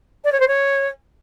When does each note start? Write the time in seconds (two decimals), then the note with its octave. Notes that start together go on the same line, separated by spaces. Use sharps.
0.24 D5
0.32 C#5
0.40 C5
0.48 C#5